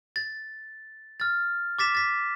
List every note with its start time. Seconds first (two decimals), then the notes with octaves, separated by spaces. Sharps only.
0.16 A6
1.20 F6 A6
1.79 D6 A6 B6 E7
1.95 A6 B6